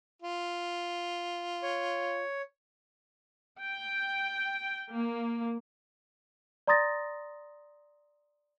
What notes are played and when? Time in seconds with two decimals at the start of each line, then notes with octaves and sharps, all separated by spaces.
0.22 F4
1.63 C#5
3.60 G5
4.91 A#3
6.67 D5 A#5 C6 D#6 A6 A#6